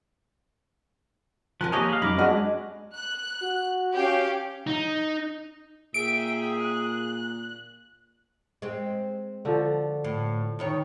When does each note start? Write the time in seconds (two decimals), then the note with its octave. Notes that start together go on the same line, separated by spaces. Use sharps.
1.61 F3 A#4 G#5 A5 F#6
1.72 A#3 D#4 G4 C#5 D#5 G#5
1.89 G#3 F5
2.02 F#2 D#4 B5 D6 F6
2.18 G#3 C4 D4 F#4 G#4 D#5
2.96 F#6
3.42 F#4
3.94 C#4 G4 F5
4.67 D#4
5.94 A#2 G#4 E5 G5 D7
6.59 F#6
8.62 G#3 C4
9.45 D3 F3 F#4
10.04 A2
10.59 E2 D#3 C#5